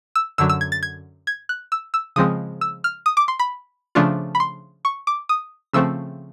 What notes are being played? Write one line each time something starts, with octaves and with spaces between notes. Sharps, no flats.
E6
F#2 D3 F#3 E6
E6
G#6
A6
G#6
G#6
F#6
E6
E6
C#3 F3 G#3 C4 D#6
E6
F6
D#6
D6
C6
B5
C#3 F3 A3 D4 F4
B5
C6
C#6
D6
D#6
C#3 F3 A3 C4 E6